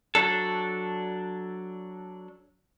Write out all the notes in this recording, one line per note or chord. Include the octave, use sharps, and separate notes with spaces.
F#3 D4 A4